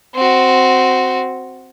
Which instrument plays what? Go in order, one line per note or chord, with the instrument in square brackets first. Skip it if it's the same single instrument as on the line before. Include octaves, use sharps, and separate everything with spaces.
[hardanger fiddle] C4 F#4